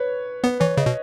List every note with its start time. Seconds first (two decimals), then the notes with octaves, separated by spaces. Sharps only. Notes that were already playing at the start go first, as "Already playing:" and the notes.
Already playing: B4 C#5
0.44 B3 B4
0.60 E3 C#5
0.77 C#3 D#5
0.86 B2